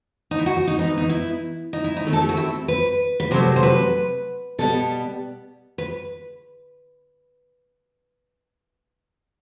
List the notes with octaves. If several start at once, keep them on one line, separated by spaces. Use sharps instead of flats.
D#4
E4
F#4
F#4
D#4
E3 B3 D#4
D#4
E4
D#4
E4
D#4
D#3 A3 C4
A4
G4
F#4
E4
B4
B4
C3 F#3 A3 C5
C5
B4
B2 G3 B3 A4
B4